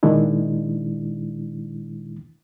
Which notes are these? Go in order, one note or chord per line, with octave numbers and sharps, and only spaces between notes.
A#2 D#3 G#3 D4 E4